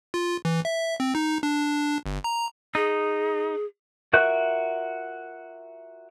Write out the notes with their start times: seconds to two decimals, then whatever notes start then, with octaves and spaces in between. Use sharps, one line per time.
0.14 F4
0.45 E3
0.65 E5
1.00 C4
1.15 D#4
1.43 D4
2.06 G1
2.24 A#5
2.75 D#4 G#4
4.13 F4 F#4 A#4 E5 F#6